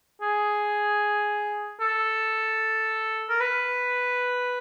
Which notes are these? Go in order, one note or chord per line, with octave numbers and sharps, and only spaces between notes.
G#4
A4
A#4
B4